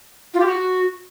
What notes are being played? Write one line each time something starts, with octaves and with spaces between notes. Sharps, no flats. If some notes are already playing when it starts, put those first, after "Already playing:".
F4
G4
F#4